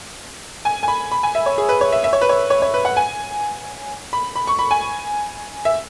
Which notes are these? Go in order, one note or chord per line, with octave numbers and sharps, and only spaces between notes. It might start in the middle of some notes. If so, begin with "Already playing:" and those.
G#5
G#5
B5
B5
G#5
E5
C#5
G#4
B4
C#5
E5
E5
C#5
B4
C#5
C#5
C#5
B4
F#5
G#5
B5
B5
C#6
B5
G#5
E5